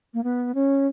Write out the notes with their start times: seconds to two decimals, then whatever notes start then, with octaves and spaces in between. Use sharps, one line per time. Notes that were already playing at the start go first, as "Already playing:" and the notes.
0.14 A#3
0.24 B3
0.55 C#4